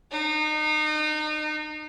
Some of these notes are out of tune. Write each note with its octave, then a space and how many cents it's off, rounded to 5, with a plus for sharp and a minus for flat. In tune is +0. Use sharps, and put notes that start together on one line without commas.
D#4 -30